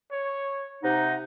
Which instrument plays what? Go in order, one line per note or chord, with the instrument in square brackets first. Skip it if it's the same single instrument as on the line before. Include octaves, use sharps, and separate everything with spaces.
[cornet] C#5
[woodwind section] C3 D#4 [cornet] F#5